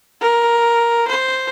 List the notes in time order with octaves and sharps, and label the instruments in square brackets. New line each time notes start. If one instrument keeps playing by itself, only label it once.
[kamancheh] A#4
C5